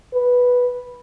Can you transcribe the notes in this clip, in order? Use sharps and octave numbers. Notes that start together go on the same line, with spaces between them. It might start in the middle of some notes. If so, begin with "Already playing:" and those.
B4